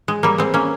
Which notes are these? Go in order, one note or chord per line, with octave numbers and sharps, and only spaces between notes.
G#3
G3 A#3
G#3 C4
A#3 C#4